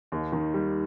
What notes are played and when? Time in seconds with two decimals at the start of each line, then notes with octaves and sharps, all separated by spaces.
0.12 D#2
0.32 D#3
0.54 G3